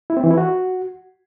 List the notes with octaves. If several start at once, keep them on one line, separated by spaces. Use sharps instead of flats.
E4
C4
E3
E4
F#4